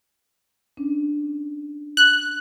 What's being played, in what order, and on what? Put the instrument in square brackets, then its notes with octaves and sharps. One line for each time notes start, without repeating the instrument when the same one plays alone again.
[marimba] C#4 D4
[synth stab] F#6